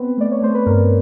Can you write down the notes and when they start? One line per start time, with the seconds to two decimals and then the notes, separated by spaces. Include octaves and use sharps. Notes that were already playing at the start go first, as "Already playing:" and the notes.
Already playing: B3 C4 B4
0.17 A3 D5
0.31 C#5
0.42 A3 C5
0.54 B4
0.66 G2 A#4